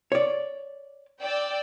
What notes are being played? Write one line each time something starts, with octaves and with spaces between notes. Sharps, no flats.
C#5 D5
D5 G5 E6